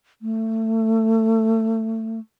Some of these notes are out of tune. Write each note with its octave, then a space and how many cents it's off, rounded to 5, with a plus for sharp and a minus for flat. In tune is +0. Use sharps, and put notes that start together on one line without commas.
A3 +25